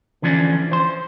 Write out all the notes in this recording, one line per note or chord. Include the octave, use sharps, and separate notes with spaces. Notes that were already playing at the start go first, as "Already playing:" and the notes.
D3 E3 F3 C#4 D5
C5 C6